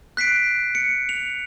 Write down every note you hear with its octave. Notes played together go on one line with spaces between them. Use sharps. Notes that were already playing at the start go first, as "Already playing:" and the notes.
F#6 B6 C7 D7
C#7
F7